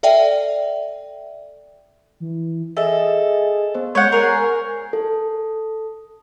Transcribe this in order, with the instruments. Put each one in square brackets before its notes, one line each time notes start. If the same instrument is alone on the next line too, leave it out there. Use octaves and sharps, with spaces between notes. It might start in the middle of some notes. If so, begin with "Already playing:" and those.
[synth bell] A4 D5 E5 G5
[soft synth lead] E3
[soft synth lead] G#4 [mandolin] A4 [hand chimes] D#5 E5
[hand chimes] B3 C5
[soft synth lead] G#3 [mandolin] C#5 F#5 [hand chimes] C#6 G6
[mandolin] G#4 A#4 [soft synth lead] C7
[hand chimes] A4